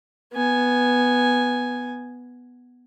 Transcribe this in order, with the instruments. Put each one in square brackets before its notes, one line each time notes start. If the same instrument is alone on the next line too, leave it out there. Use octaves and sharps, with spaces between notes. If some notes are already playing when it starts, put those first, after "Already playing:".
[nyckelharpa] B3 G#5